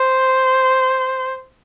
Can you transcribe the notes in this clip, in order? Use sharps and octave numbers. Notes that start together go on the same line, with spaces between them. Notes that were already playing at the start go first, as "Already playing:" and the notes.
Already playing: C5